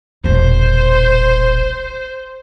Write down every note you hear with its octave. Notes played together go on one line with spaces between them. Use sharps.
E1 A#1 C5